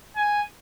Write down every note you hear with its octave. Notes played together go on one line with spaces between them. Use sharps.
G#5